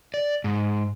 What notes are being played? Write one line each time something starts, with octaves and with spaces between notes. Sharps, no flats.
D5
G#2